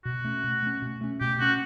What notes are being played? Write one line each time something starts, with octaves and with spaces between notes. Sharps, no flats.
B2 F#4
A3 C#4
B2
A3 C#4
B2
A3 C#4
B2 G4
A3 C#4 F#4